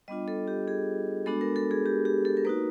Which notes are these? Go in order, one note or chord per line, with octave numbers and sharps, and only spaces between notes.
G3 B3 D4 F4 D#5
A4
G4
G#4
G#3 B3 D4 F#4 A4
A#4
A4
G#4
G4
G4
A4
A#4
A#3 D#4 F#4 B4